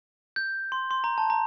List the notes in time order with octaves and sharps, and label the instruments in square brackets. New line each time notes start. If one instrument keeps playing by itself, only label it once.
[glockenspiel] G6
C6
C6
A#5
A5
A#5